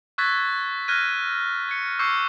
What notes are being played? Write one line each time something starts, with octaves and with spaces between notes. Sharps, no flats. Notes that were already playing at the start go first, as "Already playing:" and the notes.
C#6 E6 F#6 G#6 A6 B6
F6 F#6 G#6 A#6 D#7
G#6 C#7
C#6 D6 E6 G6 C7 C#7